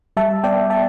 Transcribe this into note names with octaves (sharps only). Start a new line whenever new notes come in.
G3 E5 A5
B3 D5 G5
E5 A5